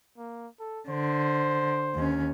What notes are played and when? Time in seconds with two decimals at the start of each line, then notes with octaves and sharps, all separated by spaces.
0.18 A#3
0.60 A4
0.89 D3 C5
1.95 D#2 C#4